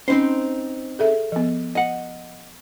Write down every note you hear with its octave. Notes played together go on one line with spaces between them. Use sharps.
C4 C#4 D#4 C5
G#4 A4 E5
F3 B3
D#5 F#5